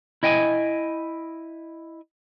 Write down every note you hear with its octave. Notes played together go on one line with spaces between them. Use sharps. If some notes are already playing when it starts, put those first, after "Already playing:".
E4 D#5 G5 G#5